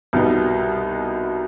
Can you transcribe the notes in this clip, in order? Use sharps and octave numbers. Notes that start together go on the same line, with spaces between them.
C2 B2 G3 B3 D#4